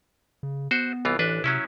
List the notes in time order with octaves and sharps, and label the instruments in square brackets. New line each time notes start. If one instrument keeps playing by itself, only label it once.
[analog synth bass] C#3
[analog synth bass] B3 [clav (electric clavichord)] F#4 C5
[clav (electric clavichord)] C2 E3 F4
[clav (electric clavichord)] A1 D4 B4 [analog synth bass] E3
[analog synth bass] C3 [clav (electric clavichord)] F#3 C#4 E4